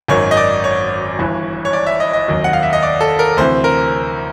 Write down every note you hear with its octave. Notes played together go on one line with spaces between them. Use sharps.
G#1 F#2 D#3 C#5
D#5
D5
C#5
G1 G2 E3
C#5
D5
E5
D#5
D#5
F1 D#2 D#3 F#3
F#5
F5
E5
D#5
D5
A4
A#4
D2 C3 E3 C5
A#4